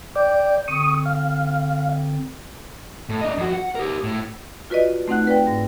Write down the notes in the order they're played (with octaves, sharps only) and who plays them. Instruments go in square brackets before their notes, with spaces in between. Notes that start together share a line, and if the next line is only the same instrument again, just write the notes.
[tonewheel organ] D5 [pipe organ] G5 G6
[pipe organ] D3 C4 [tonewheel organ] C#6 D#6
[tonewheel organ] F5
[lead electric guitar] A2
D4 D#5
F2 F#4
F#5
G4 A#4
A2
[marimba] F4 F#4 B4 D5 D#5
A3 C4 D#4 F#5 F#6
B4 D5 G5
G#2 A#6